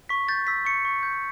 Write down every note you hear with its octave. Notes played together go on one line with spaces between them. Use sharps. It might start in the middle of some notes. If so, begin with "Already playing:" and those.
C#6 B6
G6 A6
E6 B6
C#6 C#7
C#6
G6